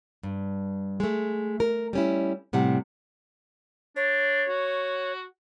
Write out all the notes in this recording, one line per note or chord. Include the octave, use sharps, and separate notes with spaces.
G2
G#3 A3
A#4
G3 C#4 E4
A2 C3 G3 F#5
D4 C#5
F#4